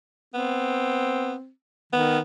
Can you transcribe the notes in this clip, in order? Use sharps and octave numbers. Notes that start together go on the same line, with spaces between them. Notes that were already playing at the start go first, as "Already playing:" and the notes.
B3 C4
D#3 B3